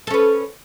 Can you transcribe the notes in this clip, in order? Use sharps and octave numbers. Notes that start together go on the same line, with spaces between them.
C#4 A4 B4